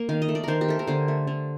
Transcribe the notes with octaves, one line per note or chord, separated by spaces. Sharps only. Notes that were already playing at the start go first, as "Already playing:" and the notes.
Already playing: A#3
D#3 F5
D#5
A3
D5
D#3 A#4 C5
G4
A3 A4
A#4
D3 C5
A3
D3